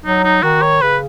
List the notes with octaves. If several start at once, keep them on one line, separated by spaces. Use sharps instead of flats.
F#3 D#4
D#4
D#3 F#4
C#5
C#3 B4